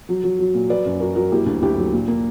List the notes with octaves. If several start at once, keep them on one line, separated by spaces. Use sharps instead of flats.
F#3
F#3
F#3
A#2
F#3 B4 D5
F#2
F#2 F#4 A#4
F#3 F#4 A#4
A#3 E4 G4
D2
D2 E4 G4
F#3
A#2
A#3